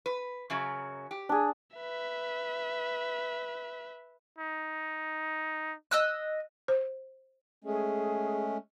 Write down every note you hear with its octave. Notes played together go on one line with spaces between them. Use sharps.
B4
F#2 C#3 F#3
G4
D4 G#4
B4 E5
D#4
D#5 E6 F#6
C5
G#3 A3 C#4 G#4